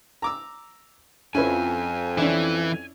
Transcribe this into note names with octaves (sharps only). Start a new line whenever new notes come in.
A#5 D6 E6
F2 C#4 E4 B4 G#5
E3 C#4 D4 E4